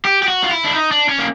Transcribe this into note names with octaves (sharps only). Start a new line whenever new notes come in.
G4
G4
F#4
F4
E4
D4
D#4
D4
C#4
A#3